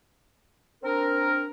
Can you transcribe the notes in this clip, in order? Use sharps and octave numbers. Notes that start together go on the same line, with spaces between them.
C4 D4 A#4